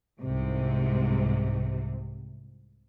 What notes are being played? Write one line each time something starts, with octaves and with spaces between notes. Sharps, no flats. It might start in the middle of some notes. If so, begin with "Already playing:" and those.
C2 G#2 C3